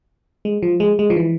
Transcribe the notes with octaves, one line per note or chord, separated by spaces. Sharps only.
G#3
F3
G#3
G#3
F3
E3